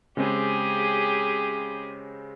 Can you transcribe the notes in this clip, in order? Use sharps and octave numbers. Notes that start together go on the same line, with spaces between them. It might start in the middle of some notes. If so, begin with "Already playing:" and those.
C#3 G#3 C4 G4 G#4